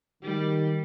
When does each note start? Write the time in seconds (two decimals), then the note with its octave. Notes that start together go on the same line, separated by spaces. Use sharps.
0.23 D#3 G3